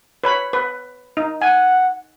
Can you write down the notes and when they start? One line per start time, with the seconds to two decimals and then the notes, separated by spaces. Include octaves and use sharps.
0.24 B4 C#5 B5
0.53 B4
1.17 D#4
1.42 F#5 G#5